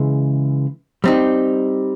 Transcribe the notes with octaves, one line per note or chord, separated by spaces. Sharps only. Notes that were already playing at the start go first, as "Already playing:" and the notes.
Already playing: C#3 E3 G#3
G3 C4 D#4